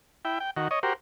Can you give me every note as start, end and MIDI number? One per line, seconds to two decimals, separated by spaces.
0.25 0.39 64
0.25 0.39 79
0.40 0.51 79
0.57 0.68 51
0.57 0.68 66
0.71 0.79 73
0.71 0.79 75
0.83 0.93 66
0.83 0.93 67
0.83 0.93 70
0.83 0.93 72